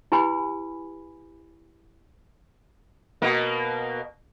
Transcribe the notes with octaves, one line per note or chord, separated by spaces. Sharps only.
E4 G4 B4 G#5 B5
B2 A#3